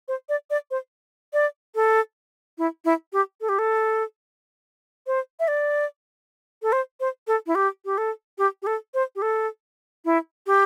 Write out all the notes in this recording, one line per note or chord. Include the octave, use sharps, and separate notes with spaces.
C5
D5
D5
C5
D5
A4
E4
E4
G4
A4
G4
A4
C5
E5
D5
A4
C5
C5
A4
E4
G4
G4
A4
G4
G4
A4
C5
G4
A4
E4
G4